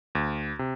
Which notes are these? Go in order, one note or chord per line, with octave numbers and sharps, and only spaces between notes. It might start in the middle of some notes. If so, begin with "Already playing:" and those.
D2
C3